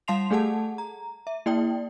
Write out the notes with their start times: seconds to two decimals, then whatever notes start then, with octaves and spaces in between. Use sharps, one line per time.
0.08 G3 F5 A5 C6 C7 F7
0.31 A3 G#4 A4 F#5 A5
0.78 A#5
1.27 E5
1.46 A#3 E4 D5 G5